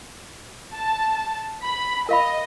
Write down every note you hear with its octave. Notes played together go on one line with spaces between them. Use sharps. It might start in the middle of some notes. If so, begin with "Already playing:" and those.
A5
B5
A#4 D#5 F5 B5